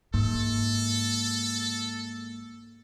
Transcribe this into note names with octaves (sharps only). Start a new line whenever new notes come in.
G#2 A#3 A4